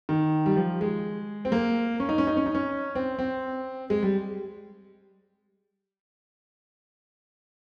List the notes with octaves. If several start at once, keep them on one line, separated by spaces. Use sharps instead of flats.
D#3
G3
F3
G#3
C4
A#3
C#4
D#4
C#4
D#4
C#4
D#4
C#4
C4
C4
G#3
G3